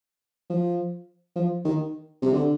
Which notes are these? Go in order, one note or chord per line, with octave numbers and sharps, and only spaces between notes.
F3
F3
D#3
C3
D3